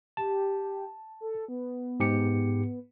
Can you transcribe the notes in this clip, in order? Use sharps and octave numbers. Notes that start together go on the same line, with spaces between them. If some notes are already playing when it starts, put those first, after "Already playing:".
G4 A5
A4
B3
G#2 G4 C#7